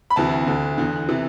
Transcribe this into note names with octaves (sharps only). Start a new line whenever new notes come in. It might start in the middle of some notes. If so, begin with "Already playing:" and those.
B5
D2 C3 E3 A5
D2 D3
E2 D3
C3 E3